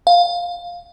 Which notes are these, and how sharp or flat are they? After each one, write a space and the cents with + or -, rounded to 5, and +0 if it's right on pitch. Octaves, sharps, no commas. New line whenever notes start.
F5 +10